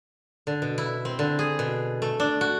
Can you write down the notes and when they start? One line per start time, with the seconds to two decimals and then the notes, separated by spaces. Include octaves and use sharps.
0.47 D3
0.62 B2
0.78 E4
1.05 C4
1.19 D3
1.39 G#4
1.59 B2
2.02 A3
2.20 D4
2.41 F#4